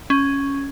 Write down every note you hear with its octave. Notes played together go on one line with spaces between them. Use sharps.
C#4